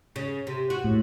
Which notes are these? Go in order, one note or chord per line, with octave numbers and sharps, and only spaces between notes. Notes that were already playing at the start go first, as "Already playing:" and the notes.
C#3
C3
F#4
A2